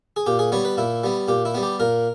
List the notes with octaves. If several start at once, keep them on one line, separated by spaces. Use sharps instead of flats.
G#4
A#2 G4
G#4
G3 B3 C#5
B4
A#2 E4
G3 B3
A#2 G4
E4
G3 B3
G4
A#2 A#4